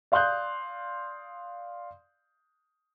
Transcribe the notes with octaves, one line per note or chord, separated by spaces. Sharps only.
D5 F5 C6 D#6 F#6 G6